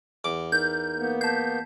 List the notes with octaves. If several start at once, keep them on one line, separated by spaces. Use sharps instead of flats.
E2 D6
D#4 A#4 G6
A#3 B3
A5 G6 B6 C7